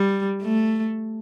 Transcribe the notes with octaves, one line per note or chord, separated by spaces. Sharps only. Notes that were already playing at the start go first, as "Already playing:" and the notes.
Already playing: G3
A3